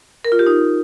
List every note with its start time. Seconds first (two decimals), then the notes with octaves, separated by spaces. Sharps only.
0.25 A#4
0.32 F4
0.39 G4
0.47 D#4